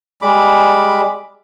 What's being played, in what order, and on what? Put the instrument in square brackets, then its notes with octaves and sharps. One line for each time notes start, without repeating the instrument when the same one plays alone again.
[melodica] G3 G#3 B5 D6